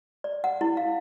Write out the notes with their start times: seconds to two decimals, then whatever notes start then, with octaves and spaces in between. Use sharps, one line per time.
0.24 D5
0.44 F#5
0.61 E4
0.77 F5